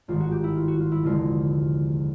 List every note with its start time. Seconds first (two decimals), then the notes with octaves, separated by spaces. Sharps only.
0.08 G#1 G2 D#3 F4
0.20 F#4
0.32 G4
0.44 E4
0.56 F4
0.68 F#4
0.80 F4
0.92 E4
1.03 F1 D#2 D3 F3 G#3 F4